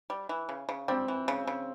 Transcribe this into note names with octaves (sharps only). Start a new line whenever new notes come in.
G3
E3
C#3
C#3
G3 C4
E3
C#3
C#3